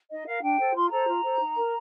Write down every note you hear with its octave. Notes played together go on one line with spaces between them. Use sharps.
D#4 D#5
A#4 F5
D4 G5
A4 C5
F4 C6
A4 C5 A#5
F4
A4 C5
D#4
A#4